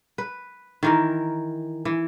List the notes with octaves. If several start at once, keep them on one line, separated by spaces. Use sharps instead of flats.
B4
D#3 E3 A#4
E3